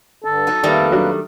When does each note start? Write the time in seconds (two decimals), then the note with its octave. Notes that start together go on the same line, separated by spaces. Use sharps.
0.24 G2 D3 A4
0.47 F#3 D#4
0.63 F2 D#3 G3 A3 A#3 B4 D5 E6
0.92 F#3 D4